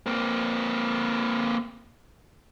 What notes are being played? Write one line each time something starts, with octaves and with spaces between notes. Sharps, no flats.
A#3 C4